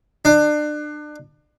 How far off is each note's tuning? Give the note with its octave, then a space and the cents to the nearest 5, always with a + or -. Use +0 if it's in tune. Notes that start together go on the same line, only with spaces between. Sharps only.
D4 +30